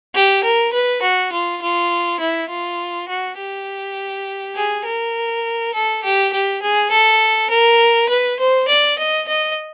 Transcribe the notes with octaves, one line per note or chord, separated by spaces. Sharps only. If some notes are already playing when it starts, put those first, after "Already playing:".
G4
A#4
B4
F#4
F4
F4
E4
F4
F#4
G4
G#4
A#4
A4
G4
G4
G#4
A4
A#4
B4
C5
D5
D#5
D#5